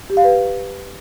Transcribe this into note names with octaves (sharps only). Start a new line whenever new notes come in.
G4
F5
B4